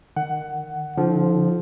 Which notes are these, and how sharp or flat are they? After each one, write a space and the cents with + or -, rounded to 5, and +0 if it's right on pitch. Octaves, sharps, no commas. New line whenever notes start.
D#3 -25 F#5 +15
D3 -30 F3 +0 D#4 +30